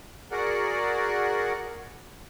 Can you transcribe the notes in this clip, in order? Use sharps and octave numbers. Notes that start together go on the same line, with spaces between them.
F#4 G#4 A#4 D5 F#5